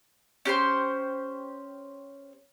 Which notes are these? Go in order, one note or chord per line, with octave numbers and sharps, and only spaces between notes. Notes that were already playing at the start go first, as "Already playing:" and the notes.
C#4 G4 C5 C6